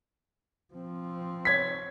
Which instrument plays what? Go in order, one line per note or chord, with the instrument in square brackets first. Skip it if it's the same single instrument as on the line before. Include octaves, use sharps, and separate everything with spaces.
[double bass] F3 C4
[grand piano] C#5 G#6 B6